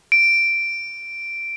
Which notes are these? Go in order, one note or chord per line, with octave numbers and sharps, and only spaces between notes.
D7